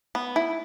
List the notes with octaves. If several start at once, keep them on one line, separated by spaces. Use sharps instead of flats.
B3
E4